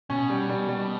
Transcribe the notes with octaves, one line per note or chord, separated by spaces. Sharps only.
B2 C#4
G3
G3
G3